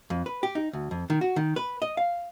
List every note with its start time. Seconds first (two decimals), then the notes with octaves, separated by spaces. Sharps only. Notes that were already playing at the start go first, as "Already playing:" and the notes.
0.10 F2
0.26 B4
0.43 G4
0.55 D#4
0.73 D2
0.91 F2
1.10 D#3
1.21 F#4
1.36 D#3
1.56 B4
1.82 D#5
1.97 F5